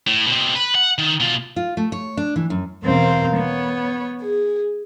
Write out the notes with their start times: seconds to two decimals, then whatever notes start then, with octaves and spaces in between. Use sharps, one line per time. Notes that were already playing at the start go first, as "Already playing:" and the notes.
0.07 A2
0.27 B2 C4
0.55 B4
0.75 F#5
0.98 D#3
1.20 B2 F4
1.56 F4
1.77 A3
1.92 C#5
2.17 D4
2.36 E3
2.50 F#2
2.83 E2 B2 C4 A#4 F5
3.35 B3 C#5
4.22 G#4